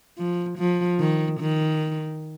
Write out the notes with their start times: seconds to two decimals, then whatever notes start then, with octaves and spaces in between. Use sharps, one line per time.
0.18 F3
0.58 F3
0.99 D#3
1.40 D#3